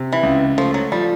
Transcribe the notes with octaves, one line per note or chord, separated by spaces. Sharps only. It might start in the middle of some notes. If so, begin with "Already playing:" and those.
Already playing: C3
E3
C#2
F3 A3
F#3
F3 G3